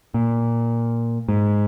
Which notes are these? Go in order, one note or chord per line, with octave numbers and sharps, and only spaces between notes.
A#2
G#2